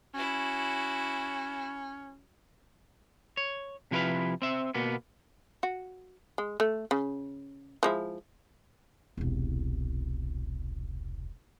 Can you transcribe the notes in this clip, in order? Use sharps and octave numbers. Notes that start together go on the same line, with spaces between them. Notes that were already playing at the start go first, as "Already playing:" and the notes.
C#4 E4 F#4
C#5
C3 F3 E4 A#4 B4 F5
C4 E5
B2 A#3 B3
F#4
G#3
A3
C#3
F3 G#3 E4
E1 C2